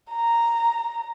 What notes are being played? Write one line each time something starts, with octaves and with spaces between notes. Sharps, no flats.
A#5